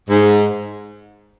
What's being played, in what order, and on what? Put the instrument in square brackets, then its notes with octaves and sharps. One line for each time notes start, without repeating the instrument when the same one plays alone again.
[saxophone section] G#2